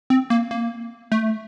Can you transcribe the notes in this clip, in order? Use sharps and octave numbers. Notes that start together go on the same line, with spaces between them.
C4
A#3
A#3
A3